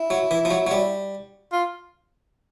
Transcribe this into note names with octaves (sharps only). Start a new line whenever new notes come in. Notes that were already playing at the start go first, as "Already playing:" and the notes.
Already playing: E4
F#3
E3
F3
F#3
F#3
G3
F4